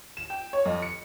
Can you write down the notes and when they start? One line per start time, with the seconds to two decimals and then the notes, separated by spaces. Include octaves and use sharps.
0.17 E7
0.30 G5
0.53 C#5
0.65 F2
0.82 C#7